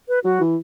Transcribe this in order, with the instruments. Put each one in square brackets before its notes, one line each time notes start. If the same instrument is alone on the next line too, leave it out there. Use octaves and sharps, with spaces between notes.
[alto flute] B4
[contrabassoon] F#3 [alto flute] F#4
[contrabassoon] E3